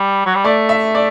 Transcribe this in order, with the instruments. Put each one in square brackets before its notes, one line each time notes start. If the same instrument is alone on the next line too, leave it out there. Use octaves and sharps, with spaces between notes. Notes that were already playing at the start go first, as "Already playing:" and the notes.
Already playing: [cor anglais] G3
F#3
G3
[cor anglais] A3 [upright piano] D5
[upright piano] E5
D5